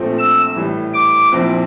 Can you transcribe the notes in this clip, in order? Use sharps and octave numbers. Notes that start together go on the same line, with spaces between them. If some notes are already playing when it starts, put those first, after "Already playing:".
Already playing: A#1 A#2 F3 A3 C4
E6
A2 E3 G3
D6
A#1 A#2 F3 C4 E4